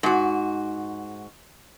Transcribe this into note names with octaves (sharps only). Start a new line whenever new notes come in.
G#2 F#4